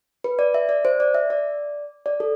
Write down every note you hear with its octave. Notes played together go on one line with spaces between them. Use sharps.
B4
D5
E5
D5
C5
D5
E5
D5
D5
A4